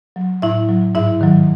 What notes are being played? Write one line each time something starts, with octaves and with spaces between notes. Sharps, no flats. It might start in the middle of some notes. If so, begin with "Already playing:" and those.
F#3
A2 E4 E5
F#3
G#2 E4 E5
D#3 F#3